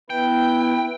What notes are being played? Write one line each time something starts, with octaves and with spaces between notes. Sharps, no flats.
B3 E4 B4 G5